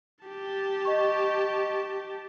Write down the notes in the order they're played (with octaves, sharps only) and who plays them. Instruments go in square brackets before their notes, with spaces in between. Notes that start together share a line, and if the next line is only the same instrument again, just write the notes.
[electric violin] G4 A5
[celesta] D#5 C#6